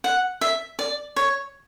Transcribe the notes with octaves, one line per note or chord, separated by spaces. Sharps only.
F#5
E5
D5
C#5